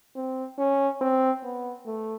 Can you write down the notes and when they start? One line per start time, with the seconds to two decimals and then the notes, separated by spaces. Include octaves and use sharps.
0.16 C4
0.58 C#4
1.01 C4
1.43 B3
1.86 A3